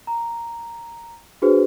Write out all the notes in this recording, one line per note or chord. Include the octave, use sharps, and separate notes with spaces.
A#5
D4 F#4 G#4 B4 C5